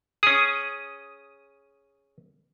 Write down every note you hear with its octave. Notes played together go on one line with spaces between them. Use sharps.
C#4 G#4 D#6